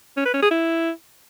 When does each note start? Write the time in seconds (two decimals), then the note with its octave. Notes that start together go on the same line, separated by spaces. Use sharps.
0.17 C#4
0.25 B4
0.34 C#4
0.42 G#4
0.51 E4